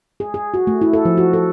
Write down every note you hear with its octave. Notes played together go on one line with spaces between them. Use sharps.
G#4
G#4
F#4
A3
E4
A4
F3
F#4
A4